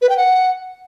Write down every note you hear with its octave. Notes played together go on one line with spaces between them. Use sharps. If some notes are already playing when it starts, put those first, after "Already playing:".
B4
G5
F#5